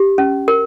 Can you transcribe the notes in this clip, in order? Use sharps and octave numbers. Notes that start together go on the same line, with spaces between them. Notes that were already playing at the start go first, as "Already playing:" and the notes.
Already playing: G4
C#4
A#4